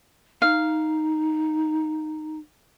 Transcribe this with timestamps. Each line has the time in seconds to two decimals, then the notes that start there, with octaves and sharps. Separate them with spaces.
0.42 D#4 F5